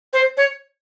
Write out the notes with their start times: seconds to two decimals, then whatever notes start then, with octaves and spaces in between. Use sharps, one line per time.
0.13 C5
0.37 C#5